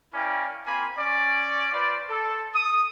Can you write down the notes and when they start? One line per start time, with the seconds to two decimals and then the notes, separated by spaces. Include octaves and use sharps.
0.14 C#4 E4 A#4 D5 F5 G5
0.66 A#3 C4 F4 G#5 B5 C6
0.98 C#4 D5
1.73 F4 B4 C5 D5
2.09 A4
2.54 D#6